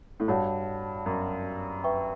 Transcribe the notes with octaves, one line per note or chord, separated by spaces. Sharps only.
A2
G2 F#4 C#5 F#5 A5
F#2
B4 E5 G5 C#6